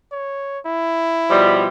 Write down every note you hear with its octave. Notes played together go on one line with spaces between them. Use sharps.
C#5
E4
B2 F3 G3